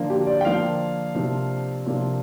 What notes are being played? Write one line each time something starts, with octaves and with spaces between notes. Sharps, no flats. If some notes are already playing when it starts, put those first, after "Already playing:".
Already playing: D3 F3 A#3 D4
G4
D5
G5
D3 F3 A#3 D4 F5
C3 F3 A#3 D4
C3 F3 A#3 D4